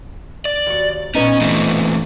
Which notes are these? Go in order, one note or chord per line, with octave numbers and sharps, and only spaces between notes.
D5
D#2 F#4
A#2 B3 C#4 D#4
E3 A3 C4